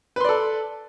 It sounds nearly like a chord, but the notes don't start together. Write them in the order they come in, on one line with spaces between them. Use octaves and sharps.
B4 C6 D5 A4